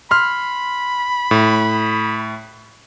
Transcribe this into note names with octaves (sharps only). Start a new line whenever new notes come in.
B5 C6 F6
A2